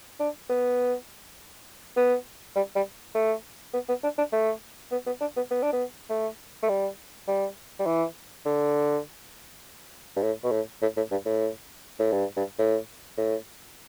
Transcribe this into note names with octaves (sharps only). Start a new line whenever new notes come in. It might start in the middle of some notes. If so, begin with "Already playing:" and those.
D4
B3
B3
G3
G3
A3
B3
B3
D4
D4
A3
B3
B3
D4
B3
B3
D4
B3
A3
A3
G3
G3
G3
E3
D3
G2
A2
B2
A2
A2
A2
G2
A2
A2
G2
G2
A2
A2